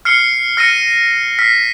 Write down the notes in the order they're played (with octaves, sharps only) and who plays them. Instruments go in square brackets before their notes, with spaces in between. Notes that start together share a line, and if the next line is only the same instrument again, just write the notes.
[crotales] F6 C7 C#7 G7
F6 A#6 C#7 D#7
F6 B6 C7